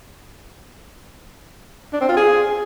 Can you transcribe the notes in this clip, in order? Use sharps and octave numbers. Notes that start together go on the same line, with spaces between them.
D4
C4
F4
G#4